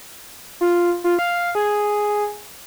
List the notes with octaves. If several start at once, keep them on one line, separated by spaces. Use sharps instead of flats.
F4
F4
F5
G#4